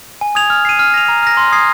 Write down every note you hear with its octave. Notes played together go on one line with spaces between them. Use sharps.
G#5
D#6 G#6 F7
F6
C7 D#7
F6
A#6 F7
A#5
F6 A#6
C6
D#6 G#6 C7